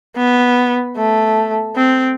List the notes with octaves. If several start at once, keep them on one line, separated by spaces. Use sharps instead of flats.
B3
A3
C4